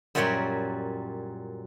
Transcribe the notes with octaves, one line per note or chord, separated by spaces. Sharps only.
F#2 A#2 G3 F#4 C#5 G5